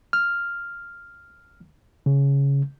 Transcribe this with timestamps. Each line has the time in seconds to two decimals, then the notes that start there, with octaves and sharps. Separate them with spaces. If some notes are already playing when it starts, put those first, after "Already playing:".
0.13 F6
2.06 C#3